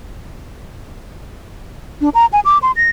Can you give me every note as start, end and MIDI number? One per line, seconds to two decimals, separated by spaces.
2.01 2.09 62
2.14 2.26 82
2.33 2.40 80
2.45 2.58 86
2.62 2.71 84
2.76 2.90 94